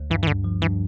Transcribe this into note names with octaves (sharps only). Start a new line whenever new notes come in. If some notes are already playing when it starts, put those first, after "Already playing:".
Already playing: D2
G2 E3
E3
G2 D3
F3
G2 E3